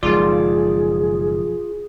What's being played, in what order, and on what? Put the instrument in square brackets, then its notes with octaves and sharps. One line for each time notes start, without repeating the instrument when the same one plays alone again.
[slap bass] F#1 D#3 G#3 [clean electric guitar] B1 F3 D5 [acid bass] F4 [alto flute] G#4